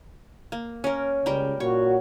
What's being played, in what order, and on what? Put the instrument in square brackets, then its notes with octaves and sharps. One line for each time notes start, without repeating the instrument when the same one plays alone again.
[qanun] A#3
C#4 A#4
[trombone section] C#2 [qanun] G3 A#4 G5
[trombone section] A#2 F#4 [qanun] C#5